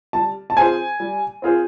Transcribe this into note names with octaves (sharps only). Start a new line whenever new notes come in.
G3 A5
A5
C4 F4 G#4 C5 G#5
G3
C4 F4 G#4 C5